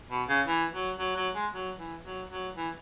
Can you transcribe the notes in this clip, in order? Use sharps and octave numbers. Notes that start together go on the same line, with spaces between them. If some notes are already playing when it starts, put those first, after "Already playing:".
B2
C#3
E3
F#3
F#3
F#3
G#3
F#3
E3
F#3
F#3
E3